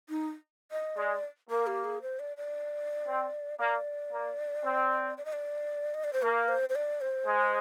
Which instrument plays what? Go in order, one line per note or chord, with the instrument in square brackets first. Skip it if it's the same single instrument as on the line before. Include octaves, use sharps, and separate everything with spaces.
[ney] D#4
D#5
[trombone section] G#3 [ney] D5
[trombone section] A#3 [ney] A#4
[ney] G4
G#4
C5
D5
D5
[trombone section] C4
[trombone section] A#3 [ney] D5
[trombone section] A#3
C4
[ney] D5
D#5
D5
D#5
D5
C5
[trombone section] A#3 [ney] A#4
[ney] C5
C5
D5
C5
[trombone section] G#3